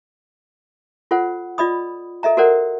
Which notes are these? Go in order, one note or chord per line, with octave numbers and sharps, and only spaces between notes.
F4 A4 C5 F#5
F4 D5 D#5 B5 D#6
A4 D#5 E5 A#5
F#4 A4 A#4 C5 D5 F#5